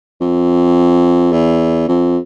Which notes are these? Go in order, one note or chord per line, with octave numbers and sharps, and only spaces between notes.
F2
E2
F2